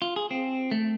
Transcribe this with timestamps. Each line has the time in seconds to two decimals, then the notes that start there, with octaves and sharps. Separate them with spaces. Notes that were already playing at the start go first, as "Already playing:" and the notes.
0.02 F4
0.16 G#4
0.31 C4
0.71 A3